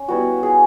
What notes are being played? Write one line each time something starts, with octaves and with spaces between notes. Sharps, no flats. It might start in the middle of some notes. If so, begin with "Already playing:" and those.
Already playing: C#4
G3 B3 E4 F#4
G#4